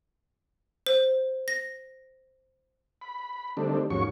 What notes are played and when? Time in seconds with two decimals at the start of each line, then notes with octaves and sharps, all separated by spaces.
0.87 C5
1.48 A#6
3.01 B5
3.57 D3 D#3 G3 A3 C4 D4
3.90 D#2 G#2 F3 F#3 C#4 C#6